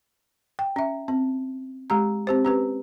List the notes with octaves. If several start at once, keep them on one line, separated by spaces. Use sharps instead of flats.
G5
C#4 E5
C4
G#3 G4 A#5
C4 G4 C5
C#4 G4 B4